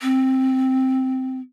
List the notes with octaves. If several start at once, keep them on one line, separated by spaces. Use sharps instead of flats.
C4